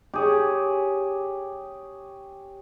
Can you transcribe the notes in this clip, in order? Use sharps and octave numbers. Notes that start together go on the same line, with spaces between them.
G4 G#4 C#5